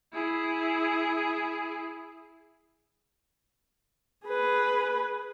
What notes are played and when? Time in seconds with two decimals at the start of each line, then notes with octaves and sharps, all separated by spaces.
0.13 E4 G#4
4.26 G#4 B4